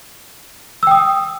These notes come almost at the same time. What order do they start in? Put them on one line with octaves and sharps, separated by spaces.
E6 G5 D#6